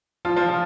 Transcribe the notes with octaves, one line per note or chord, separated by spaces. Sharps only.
F3 F4
F3 F4
F3 F4